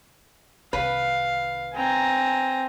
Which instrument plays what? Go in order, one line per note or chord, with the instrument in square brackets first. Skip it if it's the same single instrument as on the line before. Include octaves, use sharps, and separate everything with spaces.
[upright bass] C2 D#3 [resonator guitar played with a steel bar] B4 [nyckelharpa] F5
[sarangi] C4 [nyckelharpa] G#5 A#5